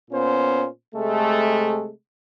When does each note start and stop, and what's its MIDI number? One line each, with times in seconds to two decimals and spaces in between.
0.11 0.65 46
0.11 0.65 59
0.11 0.65 61
0.11 0.65 72
0.94 1.90 48
0.94 1.90 56
0.94 1.90 57